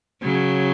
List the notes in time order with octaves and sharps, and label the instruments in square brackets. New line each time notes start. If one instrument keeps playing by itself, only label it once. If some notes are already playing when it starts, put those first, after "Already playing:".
[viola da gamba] C#3 F#3